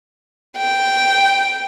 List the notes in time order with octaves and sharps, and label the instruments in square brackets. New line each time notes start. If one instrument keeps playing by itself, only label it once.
[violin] G5